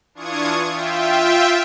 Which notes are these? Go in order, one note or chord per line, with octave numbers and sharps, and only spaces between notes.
E3 D4 F4 C#6 D#6 G#6
F4 E5 G5